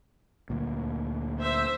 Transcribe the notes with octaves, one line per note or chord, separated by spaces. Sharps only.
D2 A#2
C5 E5